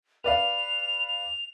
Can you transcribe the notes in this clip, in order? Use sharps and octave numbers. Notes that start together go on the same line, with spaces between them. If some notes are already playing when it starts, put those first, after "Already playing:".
B4 D5 F5 F7
F7